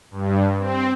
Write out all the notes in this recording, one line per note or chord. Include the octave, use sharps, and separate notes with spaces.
G2
C4